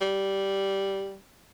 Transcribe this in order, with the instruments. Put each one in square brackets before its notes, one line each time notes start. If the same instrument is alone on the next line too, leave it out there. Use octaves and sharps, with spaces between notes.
[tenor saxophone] G3